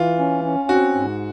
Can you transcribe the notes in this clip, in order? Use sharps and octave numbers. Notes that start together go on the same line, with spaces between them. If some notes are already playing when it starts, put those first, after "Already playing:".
Already playing: E3 F4
C#4
C#4
C4 F#4
G#2